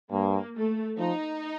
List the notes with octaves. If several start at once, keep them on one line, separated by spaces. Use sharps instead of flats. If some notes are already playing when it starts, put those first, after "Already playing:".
G2 A#3
A3
F3 D#4